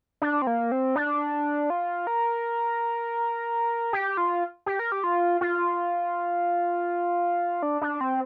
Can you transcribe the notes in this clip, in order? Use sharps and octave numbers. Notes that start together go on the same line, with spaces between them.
D4
C4
A#3
C4
D4
F4
A#4
G4
F4
G4
A#4
G4
F4
F4
D4
D4
C4